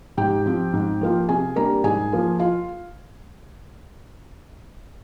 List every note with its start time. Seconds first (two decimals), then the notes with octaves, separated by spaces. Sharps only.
0.17 G#2 G4 G5
0.46 F3 C4 F4
0.73 G#2
1.01 F3 A#3 F4
1.28 C3 G#4 G#5
1.56 G3 A#3 D4 A#4 A#5
1.84 G#2 G#4 G#5
2.12 F3 A#3 F4
2.39 F4 F5